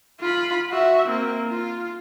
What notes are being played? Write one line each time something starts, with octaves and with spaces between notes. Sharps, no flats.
F4 B5
F#4 E5
A#3 C4
F4